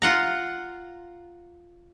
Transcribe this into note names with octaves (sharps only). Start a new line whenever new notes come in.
F4 F#5 A#5